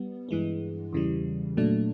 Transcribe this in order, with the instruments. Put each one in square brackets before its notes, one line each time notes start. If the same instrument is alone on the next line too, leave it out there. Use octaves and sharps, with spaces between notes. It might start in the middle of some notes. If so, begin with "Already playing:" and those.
Already playing: [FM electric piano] G3 B3
G2 E3 G#3 B3
E2 C#3 E3 G3
A#2 F#3 A3 D4